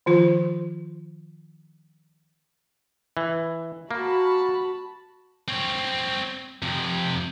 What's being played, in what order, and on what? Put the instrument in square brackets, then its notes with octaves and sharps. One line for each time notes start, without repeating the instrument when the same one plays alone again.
[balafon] D#3 F3 F4 C5
[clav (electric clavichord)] E3
[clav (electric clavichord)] A#3 [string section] F#4 A5 B5
[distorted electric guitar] C4 C#5
F2 C3